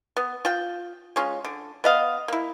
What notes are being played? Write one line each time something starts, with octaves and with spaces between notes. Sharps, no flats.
B3
F4 G5
G#3 C#4 F4
D3
B3 D#5 F5
A#3 E4